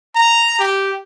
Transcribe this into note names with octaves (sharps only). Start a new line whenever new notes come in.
A#5
G4